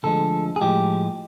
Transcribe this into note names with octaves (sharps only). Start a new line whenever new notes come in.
D2 D3 F3 G#3 A4
G#4
A2 F3 G#3 G4